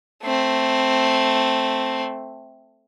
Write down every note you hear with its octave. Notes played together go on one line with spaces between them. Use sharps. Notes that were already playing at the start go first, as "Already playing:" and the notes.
A3 C4